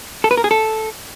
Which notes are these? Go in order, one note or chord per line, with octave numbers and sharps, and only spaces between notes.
A4
B4
A#4
G#4
A4